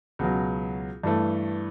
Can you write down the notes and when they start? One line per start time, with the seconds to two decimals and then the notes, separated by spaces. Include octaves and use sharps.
0.19 C#2 B2 F#3
1.04 G2 E3 A3